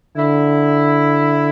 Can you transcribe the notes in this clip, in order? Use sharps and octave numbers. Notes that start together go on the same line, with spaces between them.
D3 E4